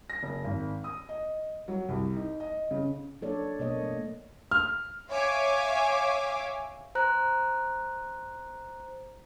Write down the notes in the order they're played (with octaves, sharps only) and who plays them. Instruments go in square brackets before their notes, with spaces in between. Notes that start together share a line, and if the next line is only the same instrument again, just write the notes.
[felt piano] A#6
F#1
G#1
D#6
D#5
F#3
C2
D#4
D#5
C#3
[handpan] F#3 A#3 D4 A4 C#5 D5
B2 A#3 B3 A4 C#5 D#5
A3
[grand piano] F6
[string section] C#5 E5 F5 G#5 D6
[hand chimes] C5 A#5 F#6